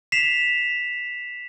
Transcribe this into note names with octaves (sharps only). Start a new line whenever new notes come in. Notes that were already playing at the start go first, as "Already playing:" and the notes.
B6 C7 E7 F7